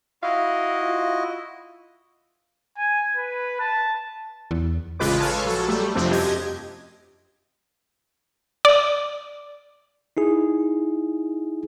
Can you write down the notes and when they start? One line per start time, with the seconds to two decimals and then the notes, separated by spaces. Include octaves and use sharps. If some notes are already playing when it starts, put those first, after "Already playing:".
0.23 E4 F#4 D#5 F5
0.81 F4
2.78 G#5
3.17 B4
3.60 A5
4.51 E2
4.99 A1 C#3 G#3 F4 B4 D6
5.20 A4 C#5 F5 G#5 A5
5.45 A#1 F#3 A4
5.68 G3 A3
5.95 F2 C3 F3 A3 C4 D4
6.10 F#2 G4 D#5 G#6
8.65 D5
10.17 D#4 E4 G#4